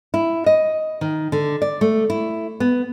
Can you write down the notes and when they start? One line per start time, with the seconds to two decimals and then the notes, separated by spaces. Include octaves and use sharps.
0.14 E4
0.46 D#5
1.01 D#3
1.32 D3
1.62 D5
1.81 A3
2.10 E4
2.60 B3